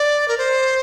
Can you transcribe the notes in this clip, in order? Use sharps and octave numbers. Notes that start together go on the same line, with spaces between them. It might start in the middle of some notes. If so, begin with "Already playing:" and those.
Already playing: D5
A#4
C5